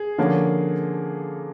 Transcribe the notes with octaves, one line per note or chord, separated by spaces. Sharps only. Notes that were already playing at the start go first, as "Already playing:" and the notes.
Already playing: G#4
D3 F3 A#3 C#4